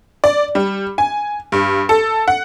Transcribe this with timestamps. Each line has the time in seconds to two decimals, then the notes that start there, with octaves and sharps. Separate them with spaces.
0.24 D5
0.55 G3
0.98 G#5
1.52 G2
1.89 A4
2.28 F#5